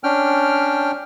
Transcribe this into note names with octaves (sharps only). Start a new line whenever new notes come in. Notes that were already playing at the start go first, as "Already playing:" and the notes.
C#4 D4 G5 F6